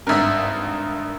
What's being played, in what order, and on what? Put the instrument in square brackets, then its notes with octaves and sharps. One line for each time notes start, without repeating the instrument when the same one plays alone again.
[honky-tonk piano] G#1 G2 [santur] A#4 E5